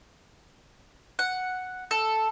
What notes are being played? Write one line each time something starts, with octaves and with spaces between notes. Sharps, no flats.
F#5
A4